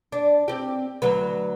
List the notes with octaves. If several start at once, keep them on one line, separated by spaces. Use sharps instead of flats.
D4
C4 G4
D2 F#3 B4